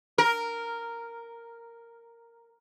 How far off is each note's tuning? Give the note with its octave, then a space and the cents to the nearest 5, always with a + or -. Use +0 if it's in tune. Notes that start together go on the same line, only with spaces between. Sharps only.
A#4 -5